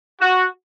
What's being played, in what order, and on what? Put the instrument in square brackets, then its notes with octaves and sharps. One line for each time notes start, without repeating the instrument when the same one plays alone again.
[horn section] F#4